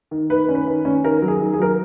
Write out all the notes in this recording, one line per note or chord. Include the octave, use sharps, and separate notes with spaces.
D#3
D#3 B4
C#4
B4
D#3
C#4
D#3 A#4
F#3
G#4
D#3
G#4
F#3 A#4